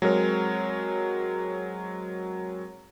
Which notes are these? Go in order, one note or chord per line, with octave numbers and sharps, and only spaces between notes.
F#3 G#3 C4 A#4 C#5